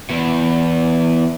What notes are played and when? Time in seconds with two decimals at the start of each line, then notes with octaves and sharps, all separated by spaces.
0.10 E2